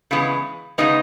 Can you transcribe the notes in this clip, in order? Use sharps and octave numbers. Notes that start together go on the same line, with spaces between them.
C#3 E3 G#3 B3
C#3 G#3 B3 D#4 D#5